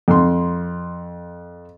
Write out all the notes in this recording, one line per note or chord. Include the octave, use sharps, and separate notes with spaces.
F2 C6